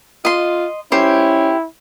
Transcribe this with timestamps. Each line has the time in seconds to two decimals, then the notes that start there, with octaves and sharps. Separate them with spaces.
0.25 F4 D#5 C6
0.92 C#4 E4 G4 C5